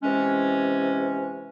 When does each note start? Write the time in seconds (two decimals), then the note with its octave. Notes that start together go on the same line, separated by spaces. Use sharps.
0.02 C3 E3 G#3 C#4